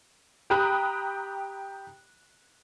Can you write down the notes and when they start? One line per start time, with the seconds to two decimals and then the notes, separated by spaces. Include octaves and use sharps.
0.50 G4 G5 A#5 B5 D#6 F#6